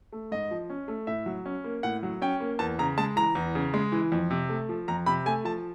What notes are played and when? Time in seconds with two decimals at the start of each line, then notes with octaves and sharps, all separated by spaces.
0.12 A3
0.32 G#2 D#5
0.51 F3
0.70 C#4
0.88 A3
1.07 A2 E5
1.26 F#3
1.46 C#4
1.64 A#3
1.83 A2 F#5
2.03 F#3
2.22 C#4 G5
2.40 A#3
2.59 E2 A5
2.79 C#3 A#5
2.98 G#3 A5
3.16 E3 A#5
3.35 E2
3.55 C#3
3.74 G#3
3.92 E3
4.12 F2
4.30 C3
4.49 A3
4.69 F3
4.88 F2 A#5
5.06 C3 B5
5.26 A3 G#5
5.44 F3 A5